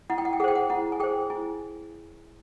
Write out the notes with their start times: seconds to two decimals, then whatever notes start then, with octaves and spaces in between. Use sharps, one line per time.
0.10 E4 F#5
0.18 G5
0.25 F#5
0.33 G5
0.40 G#4 F#5
0.44 C5 G5
0.55 F#5
0.70 E4 F#5
0.92 G#5
1.00 G#4 C5 G5
1.30 E4 G#5